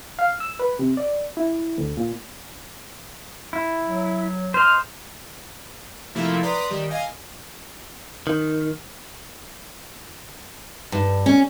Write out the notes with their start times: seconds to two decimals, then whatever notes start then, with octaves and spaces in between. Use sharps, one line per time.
0.19 F5
0.40 E6
0.59 B4
0.79 C3
0.97 D5
1.37 E4
1.78 D2
1.97 A#2
3.53 E4
3.87 F#3
4.54 C5 D#5 F6
6.15 C3 F3 A3 A#3 E4
6.42 B4 D5 A#5 C6 D#6 B6
6.70 D#3 G3 G4
6.90 D#5 F5 G#5
8.27 D#3
10.92 G2
11.26 C#4